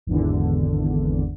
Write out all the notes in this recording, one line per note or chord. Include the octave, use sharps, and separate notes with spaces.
G#1 E2 D3